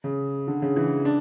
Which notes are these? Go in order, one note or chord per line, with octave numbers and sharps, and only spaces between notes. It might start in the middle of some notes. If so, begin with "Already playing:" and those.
C#3
D3
C#3
E3
D4